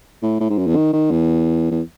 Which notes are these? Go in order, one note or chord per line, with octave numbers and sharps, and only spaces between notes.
A2
A2
G#2
F#2
E2
D#3
D#3
E2
E2